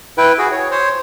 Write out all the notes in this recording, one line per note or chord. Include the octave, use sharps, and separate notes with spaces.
E4 B4 G5
F#4 G#4
C#5
C5 C#5